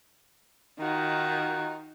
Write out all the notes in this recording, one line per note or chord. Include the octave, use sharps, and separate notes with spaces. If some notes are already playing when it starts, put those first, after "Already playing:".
D#3 D#4 F4 F#4